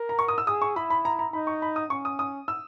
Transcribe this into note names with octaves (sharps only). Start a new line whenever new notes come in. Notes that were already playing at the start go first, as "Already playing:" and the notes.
Already playing: A#4
A#5
C#6
D#6
E6
G#4 D#6
C#6
E4 B5
B5
A#5
A#5
D#4 B5
C#6
B5
D#6
C#4 C#6
D#6
D#6
E6